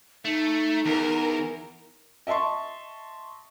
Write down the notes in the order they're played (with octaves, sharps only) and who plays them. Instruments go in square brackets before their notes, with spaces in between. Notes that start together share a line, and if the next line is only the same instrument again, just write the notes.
[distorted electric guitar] A3 [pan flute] D#4
[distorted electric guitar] E2 [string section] A#4
[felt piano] D#5 E5 A5 C6 C#6